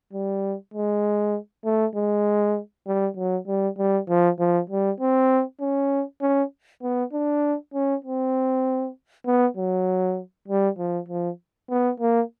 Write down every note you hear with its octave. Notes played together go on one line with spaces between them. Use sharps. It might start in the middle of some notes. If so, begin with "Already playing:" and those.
G3
G#3
A3
G#3
G3
F#3
G3
G3
F3
F3
G3
C4
C#4
C#4
B3
D4
C#4
C4
B3
F#3
G3
F3
F3
B3
A#3